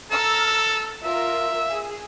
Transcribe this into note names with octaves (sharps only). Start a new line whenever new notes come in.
A4 A#5 E6 F6
F4 A#4 E5
G#4